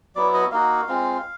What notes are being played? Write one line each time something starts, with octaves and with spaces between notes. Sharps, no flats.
F#3 B3 E4 D5
D#5
A#3 D#4 F#4 F5
G#3 C4 F4